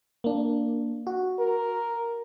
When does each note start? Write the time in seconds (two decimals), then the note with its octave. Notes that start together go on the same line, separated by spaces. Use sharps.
0.24 A#3 D4
1.07 F#4
1.39 A#4